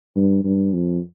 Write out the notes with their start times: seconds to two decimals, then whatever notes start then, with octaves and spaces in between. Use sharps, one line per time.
0.16 G2
0.44 G2
0.73 F2